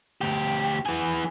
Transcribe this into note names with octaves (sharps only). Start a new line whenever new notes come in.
D2 G4
E3 G#4